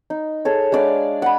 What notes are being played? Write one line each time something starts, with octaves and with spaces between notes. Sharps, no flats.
D#4
G#4 A4 C#5
G#3 D4 D5 F5
F#5 B5